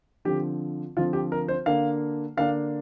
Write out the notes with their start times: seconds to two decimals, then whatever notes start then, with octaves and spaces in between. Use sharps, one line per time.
0.25 D3 F3 C4 G4
0.97 D3 F3 C4 F4
1.13 G4
1.32 A#4
1.48 C5
1.66 D3 A#3 D4 F5
2.37 D3 A#3 D4 F5